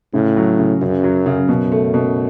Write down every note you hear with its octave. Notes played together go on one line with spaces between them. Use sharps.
A2 C#3
F#3
C#3
F#2 C#3
F#3
C#3
F#2 B2
A3
B2